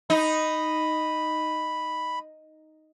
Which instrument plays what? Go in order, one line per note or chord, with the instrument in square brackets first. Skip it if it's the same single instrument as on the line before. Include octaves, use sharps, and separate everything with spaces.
[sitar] D#4 [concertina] B5